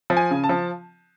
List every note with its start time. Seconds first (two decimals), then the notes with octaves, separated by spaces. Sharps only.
0.10 F3
0.17 G#5
0.31 C#3
0.44 A5
0.49 F3